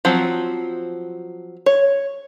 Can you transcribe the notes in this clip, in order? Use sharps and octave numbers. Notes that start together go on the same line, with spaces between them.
F3 F#3 C4
C#5